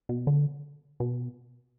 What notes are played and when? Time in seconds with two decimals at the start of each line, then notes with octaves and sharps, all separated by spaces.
0.09 B2
0.27 D3
1.00 B2